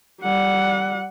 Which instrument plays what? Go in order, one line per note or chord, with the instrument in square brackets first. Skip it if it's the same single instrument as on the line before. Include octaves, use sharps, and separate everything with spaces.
[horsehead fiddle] G3 F#5